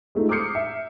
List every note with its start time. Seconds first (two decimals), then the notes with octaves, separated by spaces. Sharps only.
0.15 G#3 A3 D#4 F4
0.29 D6 D#6 F6 G6 C7 C#7
0.55 E5